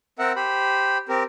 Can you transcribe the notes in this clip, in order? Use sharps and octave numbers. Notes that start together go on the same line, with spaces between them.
C4 A#4 E5 F#5
G4 C5 B5
C4 G4 A#4